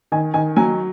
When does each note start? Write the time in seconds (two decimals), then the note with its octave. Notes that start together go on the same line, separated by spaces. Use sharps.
0.12 D#3 G#5
0.34 D#3 G#5
0.56 F#3 G#5